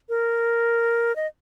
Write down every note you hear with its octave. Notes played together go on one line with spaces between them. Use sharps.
A#4
D#5